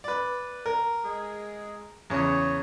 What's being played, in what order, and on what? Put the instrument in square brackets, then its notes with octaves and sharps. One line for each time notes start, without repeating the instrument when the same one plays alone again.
[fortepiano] B4 D5
A#4
[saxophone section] G#3 G#4
[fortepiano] E2 C#3 [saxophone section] C#5